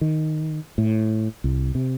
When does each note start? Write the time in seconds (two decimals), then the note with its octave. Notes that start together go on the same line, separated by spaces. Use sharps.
0.01 D#3
0.78 A2
1.44 C2
1.75 C3